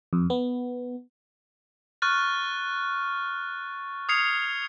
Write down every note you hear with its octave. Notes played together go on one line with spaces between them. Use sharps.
F2
B3
C#6 F6 F#6 A6
D#6 F6 G#6 C7 C#7 F7